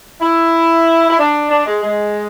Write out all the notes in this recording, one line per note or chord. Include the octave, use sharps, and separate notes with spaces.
E4
E4
D4
D4
G#3
G#3